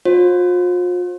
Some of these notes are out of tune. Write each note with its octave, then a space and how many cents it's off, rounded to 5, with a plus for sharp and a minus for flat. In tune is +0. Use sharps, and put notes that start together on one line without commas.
F4 +40 C5 +30